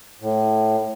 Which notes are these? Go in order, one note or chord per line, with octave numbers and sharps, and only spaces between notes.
A2